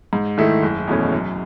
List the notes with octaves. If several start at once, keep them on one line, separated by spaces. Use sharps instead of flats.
G#2
D#3 A3 E4
F#1
E2 B2 A3 C#4
F#2